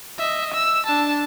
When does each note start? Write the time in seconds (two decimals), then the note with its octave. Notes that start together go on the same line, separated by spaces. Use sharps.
0.18 D#5 E5
0.54 E6
0.86 D4 A5